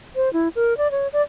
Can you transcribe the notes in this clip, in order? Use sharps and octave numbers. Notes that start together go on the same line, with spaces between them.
C5
E4
A#4
D5
C#5
D5